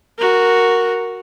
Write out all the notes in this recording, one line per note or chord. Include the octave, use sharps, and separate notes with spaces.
F#4 A#4